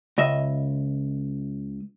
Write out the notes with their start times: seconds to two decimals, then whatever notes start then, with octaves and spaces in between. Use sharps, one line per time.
0.18 C#2 D#5 E5